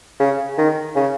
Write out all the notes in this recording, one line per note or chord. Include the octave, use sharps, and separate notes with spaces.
C#3
D#3
C#3